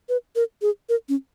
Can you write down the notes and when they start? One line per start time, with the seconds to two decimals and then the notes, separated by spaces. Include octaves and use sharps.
0.09 B4
0.36 A#4
0.62 G#4
0.89 A#4
1.09 C#4